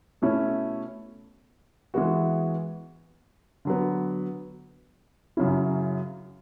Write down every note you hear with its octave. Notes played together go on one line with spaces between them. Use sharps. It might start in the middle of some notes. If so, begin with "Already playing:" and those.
B2 A3 C#4 E4
E3 G#3 B3 F#4
D3 F#3 B3
F#2 C#3 F#3 C#4 E4